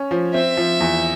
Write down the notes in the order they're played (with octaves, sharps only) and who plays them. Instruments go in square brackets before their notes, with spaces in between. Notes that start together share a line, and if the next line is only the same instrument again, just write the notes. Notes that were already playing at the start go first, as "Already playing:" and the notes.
Already playing: [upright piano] C#4
F3
[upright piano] C4 [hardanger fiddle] E5
[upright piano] F3
E2